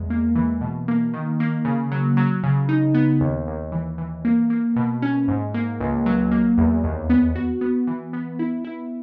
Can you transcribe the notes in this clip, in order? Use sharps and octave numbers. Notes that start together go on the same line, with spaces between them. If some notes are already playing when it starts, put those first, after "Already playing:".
Already playing: E2 G#3
A#3
E3
B2
A#3
D#3
A#3
C#3
F#3
F#3
C#3
D#4
B3
D#2
D#2
E3
E3
A#3
A#3
B2
C#4
G#2
A#3
C#2
F#3
A#3
E2
D#2
B3
F#4
B3
E3
B3
E4
E4